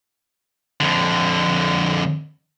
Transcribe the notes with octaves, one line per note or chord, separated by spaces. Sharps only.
F2 D3